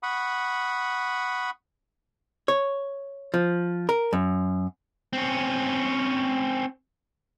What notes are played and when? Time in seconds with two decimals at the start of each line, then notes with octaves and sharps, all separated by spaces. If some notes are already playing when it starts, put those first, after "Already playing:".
0.03 F#5 B5 C#6 D#6
2.48 C#5
3.34 F3
3.89 A#4
4.13 F#2
5.13 C4 C#4